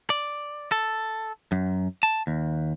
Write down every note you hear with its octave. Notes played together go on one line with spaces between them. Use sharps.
D5
A4
F#2
A5
D#2